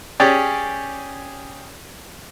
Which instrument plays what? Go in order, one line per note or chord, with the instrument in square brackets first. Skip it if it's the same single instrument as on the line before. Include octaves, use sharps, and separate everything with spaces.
[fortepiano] C#4 G4 G#4 D5